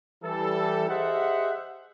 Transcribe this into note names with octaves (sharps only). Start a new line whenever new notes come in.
E3 G3 A4
G4 G#4 C5 D#5 E5 F#5